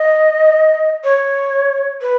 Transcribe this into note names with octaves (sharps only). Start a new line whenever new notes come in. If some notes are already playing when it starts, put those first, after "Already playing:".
Already playing: D#5
C#5
B4